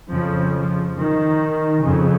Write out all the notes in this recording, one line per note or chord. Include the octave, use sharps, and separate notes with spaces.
F2 C#3 F3
F3
D#3
F2 C#3